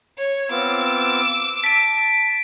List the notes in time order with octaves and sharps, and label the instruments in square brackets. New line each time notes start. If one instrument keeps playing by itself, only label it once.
[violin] C#5
[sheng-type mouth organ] B3 C4 F4 [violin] D6 E6
[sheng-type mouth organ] A5 [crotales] B6 D7